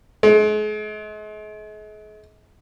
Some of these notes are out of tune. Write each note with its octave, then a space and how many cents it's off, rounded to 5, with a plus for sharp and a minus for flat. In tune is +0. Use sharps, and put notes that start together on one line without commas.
G#3 +40